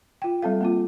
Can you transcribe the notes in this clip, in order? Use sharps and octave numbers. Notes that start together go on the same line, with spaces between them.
F4 G5
G3 C4 A4 F5
A#3 C4 F4